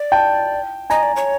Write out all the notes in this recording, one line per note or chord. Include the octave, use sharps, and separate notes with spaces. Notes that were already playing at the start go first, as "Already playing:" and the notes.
Already playing: D5
G5 A5
D#5 G#5 A#5
D5
C#5